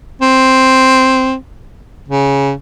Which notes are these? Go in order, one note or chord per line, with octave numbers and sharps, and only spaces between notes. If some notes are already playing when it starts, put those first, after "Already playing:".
C4
C#3